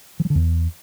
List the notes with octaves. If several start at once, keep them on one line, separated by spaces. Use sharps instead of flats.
E3
F#3
D3
E2